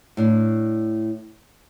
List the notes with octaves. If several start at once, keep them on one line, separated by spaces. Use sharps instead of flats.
A2 D4